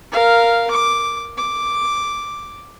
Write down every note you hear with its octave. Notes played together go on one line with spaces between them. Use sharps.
A#4 F5
D6
D6